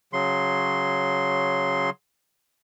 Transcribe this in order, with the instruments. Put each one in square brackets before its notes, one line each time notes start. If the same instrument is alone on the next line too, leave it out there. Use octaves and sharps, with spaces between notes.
[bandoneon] C#3 F#3 C6